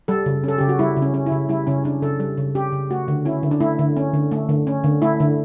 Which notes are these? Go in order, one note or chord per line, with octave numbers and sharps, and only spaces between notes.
G3 A4
C#3
C#4 A4
C#3 G4
F#4
G3 E4
C#3
C#4
C#4
E4
C#3
G3 E4
C#3 C#4
C#4 D4
C#3 A4
G3 A4
C#3
C#4 G4
C#3
A3 F#4
D3
C#4 E4
D3
D4
A3 E4
D3
C#4
D3
A3
D3
C#4
D3
A3 E4
D3